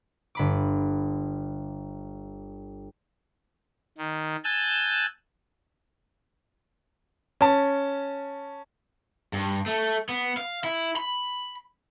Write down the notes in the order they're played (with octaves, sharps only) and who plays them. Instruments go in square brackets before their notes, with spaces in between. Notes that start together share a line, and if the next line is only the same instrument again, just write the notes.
[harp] G1 B5 D6
[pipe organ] D#3
G#5 A5 E6 F#6 G6
[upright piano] C#4 A5
[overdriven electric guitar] G2
A3
B3
F5
E4
B5